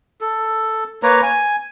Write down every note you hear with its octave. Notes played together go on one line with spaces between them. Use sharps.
A4
A#3 B4 C#5 A#5
G#5